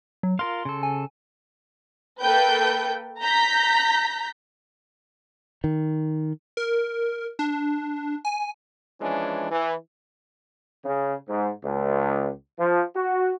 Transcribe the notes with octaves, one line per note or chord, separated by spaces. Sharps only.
F#3
F4 A#4 F5 C6
C#3 A4
G#5
A#3 A4 B4 G5 G6
A#5 G6 A#6 B6
D#3
A#4
D4
G#5
E3 F3 G#3 C#4 D4 E4
E3
C#3
G#2
C#2
F3
F#4